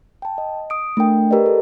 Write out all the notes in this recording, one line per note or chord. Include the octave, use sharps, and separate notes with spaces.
G5 A5
D#5
D#6 D7
A3 D4 A#4 G5
G4 A#4 B4 D5 D#5
A4